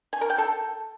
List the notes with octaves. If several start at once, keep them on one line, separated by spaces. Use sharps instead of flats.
G#5
A#4
G5
A4